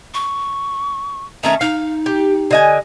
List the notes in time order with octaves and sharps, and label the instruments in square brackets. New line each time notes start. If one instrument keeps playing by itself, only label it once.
[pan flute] C#6
[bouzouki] D#3 A3 C#4 [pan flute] A#5
[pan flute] D#4 [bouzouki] F5
[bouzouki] G4
D3 D#5 G#5